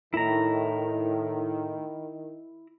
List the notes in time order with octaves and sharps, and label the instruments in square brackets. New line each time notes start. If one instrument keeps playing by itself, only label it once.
[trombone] A2 [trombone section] D#3 [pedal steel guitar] E4 A#5